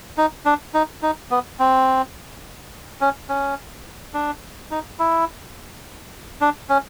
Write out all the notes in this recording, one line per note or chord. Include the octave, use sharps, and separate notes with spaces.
D#4
D4
D#4
D#4
B3
C4
C#4
C#4
D4
D#4
E4
D4
C#4